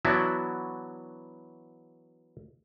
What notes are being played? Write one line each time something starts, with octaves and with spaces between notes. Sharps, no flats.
E3 F#3 B3 D4 E4 F#4